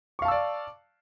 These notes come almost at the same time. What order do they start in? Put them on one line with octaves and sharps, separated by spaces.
C#6 F5 A5 E6 D5